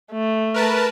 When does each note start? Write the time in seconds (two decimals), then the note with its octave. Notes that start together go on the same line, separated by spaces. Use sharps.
0.12 A3
0.54 A#4 B4 A5